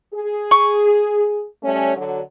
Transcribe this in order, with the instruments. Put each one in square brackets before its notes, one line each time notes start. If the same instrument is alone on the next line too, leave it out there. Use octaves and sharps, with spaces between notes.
[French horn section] G#4
[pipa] C#6
[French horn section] G3 A3 C#4
D3 F#3